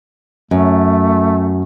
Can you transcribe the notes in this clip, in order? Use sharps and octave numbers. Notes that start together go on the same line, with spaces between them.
F#2 A3